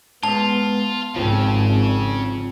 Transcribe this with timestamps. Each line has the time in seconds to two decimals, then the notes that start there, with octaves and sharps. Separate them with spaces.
0.23 C#2 G#2 B3 F4 A5
1.16 G#1 C#3 F3 C4